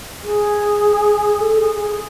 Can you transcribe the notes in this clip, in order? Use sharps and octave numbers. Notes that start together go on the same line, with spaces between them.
G#4
A4
G#4
G#4